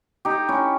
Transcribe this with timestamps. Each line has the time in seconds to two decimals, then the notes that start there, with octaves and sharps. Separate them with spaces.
0.25 D#4 G4
0.49 C#4 E4